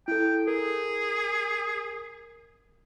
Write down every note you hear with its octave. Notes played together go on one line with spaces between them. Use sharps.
E4 A4 G5
G#4 A#4